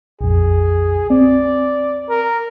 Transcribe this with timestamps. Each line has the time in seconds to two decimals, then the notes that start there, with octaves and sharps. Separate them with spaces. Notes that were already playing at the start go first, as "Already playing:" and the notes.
0.21 A#1 F2 G#4
1.10 C4 D5
2.10 A#4